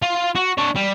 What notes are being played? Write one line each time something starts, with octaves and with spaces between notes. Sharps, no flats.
F4
F#4
D4 C#5
G3